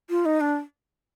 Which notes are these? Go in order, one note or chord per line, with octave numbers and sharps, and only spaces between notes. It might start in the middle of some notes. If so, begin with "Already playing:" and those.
F4
D#4
D4